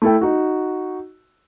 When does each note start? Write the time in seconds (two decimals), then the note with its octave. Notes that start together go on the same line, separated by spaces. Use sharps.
0.02 A3 E4 A4 G5
0.21 D#4 F#4